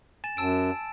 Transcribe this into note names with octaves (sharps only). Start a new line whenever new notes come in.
G#5 A6 E7
F#2 A5 E6 D7